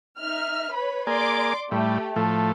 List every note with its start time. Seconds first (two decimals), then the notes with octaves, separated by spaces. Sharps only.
0.19 D#4 E5 F6
0.72 B4 C#5 B5
1.07 A#3 G#4 D5 C6 D6
1.71 A2 G3 A3 G4
2.16 A2 F3 A3 A4